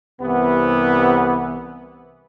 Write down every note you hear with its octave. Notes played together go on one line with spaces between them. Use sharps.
C2 C3 E3 B3